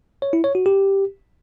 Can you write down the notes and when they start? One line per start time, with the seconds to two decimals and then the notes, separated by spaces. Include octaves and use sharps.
0.22 C#5
0.33 E4
0.44 C#5
0.55 F#4
0.66 G4